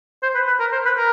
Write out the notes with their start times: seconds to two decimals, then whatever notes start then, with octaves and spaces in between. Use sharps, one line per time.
0.23 C5
0.35 B4
0.47 B4
0.60 A#4
0.72 C5
0.85 B4
0.98 A#4